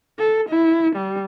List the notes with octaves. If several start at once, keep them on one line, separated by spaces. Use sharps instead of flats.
A4
E4
G3